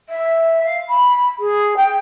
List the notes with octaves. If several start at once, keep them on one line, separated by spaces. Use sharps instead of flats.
E5
F5
B5
G#4
G5